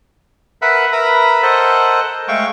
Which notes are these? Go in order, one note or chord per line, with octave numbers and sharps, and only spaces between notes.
A#4 B4 E5 F#5 B5
A#4 B4 E5 A#5 B5
A4 A#4 C5 D#5 F#5 A5
G#3 A3 F5 G5 C#6